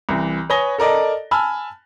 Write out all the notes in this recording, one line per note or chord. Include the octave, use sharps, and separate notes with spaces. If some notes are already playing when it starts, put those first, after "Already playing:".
C2 E3
B4 C#5 G#5 D#6 A#6 G7
A4 A#4 D5 D#5 A5
G#5 A5 B5 E6 F6